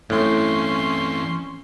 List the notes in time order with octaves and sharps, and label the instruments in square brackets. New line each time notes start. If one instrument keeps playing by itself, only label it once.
[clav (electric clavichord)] A2 [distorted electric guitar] E3 C4 [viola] C#4 C6